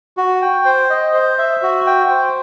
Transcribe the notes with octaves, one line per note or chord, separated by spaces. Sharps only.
F#4
G5
C5
D#5
C5
E5
F#4
G5
C5